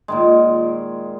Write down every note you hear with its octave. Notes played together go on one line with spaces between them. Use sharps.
A#2 D#3 G#3